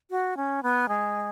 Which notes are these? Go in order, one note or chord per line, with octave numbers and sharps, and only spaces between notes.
F#4
C#4
B3
G#3